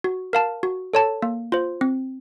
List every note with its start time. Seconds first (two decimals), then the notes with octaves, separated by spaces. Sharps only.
0.04 F#4
0.33 A#4 F5 A5
0.63 F#4
0.93 A4 C#5 A5
1.22 A#3
1.52 F4 C5
1.81 C4